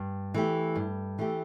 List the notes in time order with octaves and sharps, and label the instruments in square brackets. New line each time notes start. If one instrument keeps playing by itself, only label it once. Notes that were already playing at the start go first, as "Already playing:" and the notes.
Already playing: [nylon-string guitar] G2
E3 A3 G4
G2
E3 A3 G4